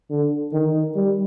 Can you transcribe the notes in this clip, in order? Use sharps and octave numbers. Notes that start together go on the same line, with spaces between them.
D3
D#3
G3